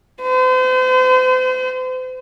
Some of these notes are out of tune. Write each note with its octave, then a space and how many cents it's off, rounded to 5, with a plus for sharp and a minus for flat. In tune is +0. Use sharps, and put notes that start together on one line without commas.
C5 -40